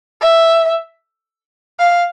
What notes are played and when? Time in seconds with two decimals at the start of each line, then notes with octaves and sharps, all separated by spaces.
0.21 E5
1.80 F5